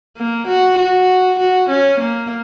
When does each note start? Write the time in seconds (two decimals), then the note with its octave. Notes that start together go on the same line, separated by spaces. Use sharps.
0.16 A#3
0.47 F#4
0.78 F#4
1.39 F#4
1.69 C#4
2.00 A#3